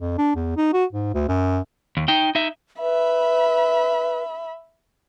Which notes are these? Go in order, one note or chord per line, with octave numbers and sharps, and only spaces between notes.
F2
D4
E2
D#4
F#4
G#2
D2
F#2
D#2
D#4 G5
D#4 E5
B4 E5 B5